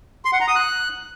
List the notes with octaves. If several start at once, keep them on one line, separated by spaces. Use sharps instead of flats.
C6
F#5
A#5
D#6
F#6